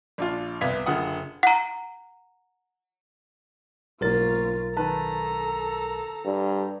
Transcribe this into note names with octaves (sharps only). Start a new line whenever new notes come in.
A#1 D4 F4
C2 B3 F5 G#6 B6
F#1 D3 F4 F#5 D#6
F#5 A#5
B1 G#2 A#3 C#4 F4 A#4 A6
D#3 A4 B4 A5 A#5
G2